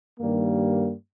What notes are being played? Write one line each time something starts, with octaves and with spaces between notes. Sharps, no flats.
G2 D#3 G3 A#3